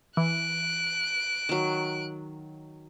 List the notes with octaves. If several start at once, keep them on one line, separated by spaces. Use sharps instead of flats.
E3 F#6 D7
D#3 F#3